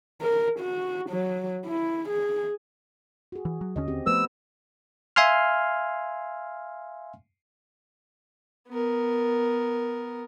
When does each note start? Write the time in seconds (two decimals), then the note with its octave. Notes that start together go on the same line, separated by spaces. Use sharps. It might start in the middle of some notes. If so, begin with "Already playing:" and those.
0.21 A#4
0.59 F#4
1.10 F#3
1.66 E4
2.09 G#4
3.32 F#4 G#4
3.45 E3
3.61 F#3
3.76 D#2 D3 C#4 D#5
3.88 C4 G4
4.06 F3 A3 B3 B4 C5 E6
5.16 E5 F5 G#5 C6 F6
8.69 B3 A#4